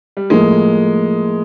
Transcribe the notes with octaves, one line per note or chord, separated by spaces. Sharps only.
G3
A2 F3 G#3 A#3